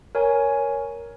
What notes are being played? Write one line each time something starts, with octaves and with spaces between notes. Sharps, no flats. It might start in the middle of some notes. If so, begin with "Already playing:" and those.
A#4 C#5 G#5